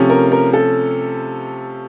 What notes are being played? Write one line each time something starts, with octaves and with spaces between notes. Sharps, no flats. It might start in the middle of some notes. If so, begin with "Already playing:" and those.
Already playing: C3 F3 A3 C#4
A#4
A#4
A4